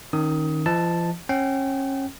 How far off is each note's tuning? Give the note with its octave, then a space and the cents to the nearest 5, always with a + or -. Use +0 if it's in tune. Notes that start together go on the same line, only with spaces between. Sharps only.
D#3 +0 C#4 -20 D#6 +20
F3 -40 D#5 +0 A5 +0
C#4 -30 G5 -40